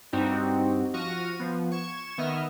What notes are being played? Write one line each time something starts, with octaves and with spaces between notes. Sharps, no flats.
G2 G3 C4 D#4 F#4 G4
F3 F#4 C#6 F6 A#6 D#7
F3 B3
C#6 G#6 E7
D#3 B3 D#5 E5 F6